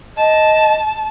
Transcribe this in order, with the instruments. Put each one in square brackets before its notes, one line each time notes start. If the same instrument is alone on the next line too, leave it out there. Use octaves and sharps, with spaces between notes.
[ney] D#5 [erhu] A5